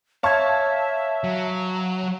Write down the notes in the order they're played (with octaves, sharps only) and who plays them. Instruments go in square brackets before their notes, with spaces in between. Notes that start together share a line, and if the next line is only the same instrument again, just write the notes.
[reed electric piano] C#5 G#6 [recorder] E5 [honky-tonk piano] F5 A5 C#6
[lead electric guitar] F#3